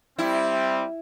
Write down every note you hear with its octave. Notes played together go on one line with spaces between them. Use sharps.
G3 C4 E4